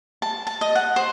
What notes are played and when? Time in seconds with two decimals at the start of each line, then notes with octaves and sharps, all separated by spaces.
0.22 A5
0.47 A5
0.61 D#5
0.75 F#5
0.96 C5